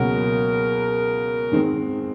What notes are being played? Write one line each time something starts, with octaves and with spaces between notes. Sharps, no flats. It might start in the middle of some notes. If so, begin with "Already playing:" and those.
Already playing: C#2 B2 F#3 A#3 C#4 A#4
G#2 D#3 G#3 C4